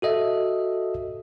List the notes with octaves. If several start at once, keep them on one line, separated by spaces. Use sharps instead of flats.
F#4 A4 D#5 E5